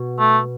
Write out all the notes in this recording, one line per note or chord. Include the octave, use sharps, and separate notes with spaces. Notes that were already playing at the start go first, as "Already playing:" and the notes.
Already playing: B2 F#4
A3